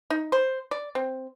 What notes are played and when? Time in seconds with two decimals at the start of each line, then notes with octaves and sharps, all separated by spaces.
0.10 D#4
0.32 C5
0.71 D5
0.95 C4